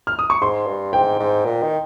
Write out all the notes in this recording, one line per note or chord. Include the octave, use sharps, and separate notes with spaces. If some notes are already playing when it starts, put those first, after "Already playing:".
F6
D#6
C#6
G#2 C6
G2
G#2 G5
G#2
A#2
D#3